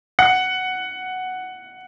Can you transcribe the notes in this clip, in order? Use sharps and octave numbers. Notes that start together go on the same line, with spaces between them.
F#5